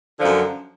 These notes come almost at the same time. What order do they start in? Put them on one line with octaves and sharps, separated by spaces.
D3 F3 F#2